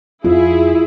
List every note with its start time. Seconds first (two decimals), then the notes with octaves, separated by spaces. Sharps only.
0.25 F2 E4 F4 G#4